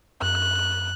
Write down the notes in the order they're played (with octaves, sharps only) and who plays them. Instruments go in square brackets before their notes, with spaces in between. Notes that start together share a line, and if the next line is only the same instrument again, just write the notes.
[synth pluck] F#2 [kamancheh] F#6